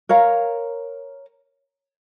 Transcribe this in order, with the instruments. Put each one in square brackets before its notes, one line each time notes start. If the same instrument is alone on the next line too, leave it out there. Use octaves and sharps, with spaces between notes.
[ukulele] A#4 C#5 F5 A#5